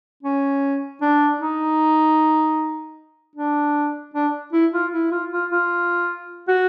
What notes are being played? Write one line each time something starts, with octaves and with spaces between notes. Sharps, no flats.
C#4
D4
D#4
D4
D4
E4
F4
E4
F4
F4
F4
F#4